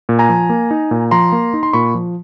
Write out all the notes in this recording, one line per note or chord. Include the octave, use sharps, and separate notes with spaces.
A#2
G#5 A#5
F3
A#3
D#4
A#2
F3 A#5 C6
A#3
D#4
C6
A#2 B5 C#6
F3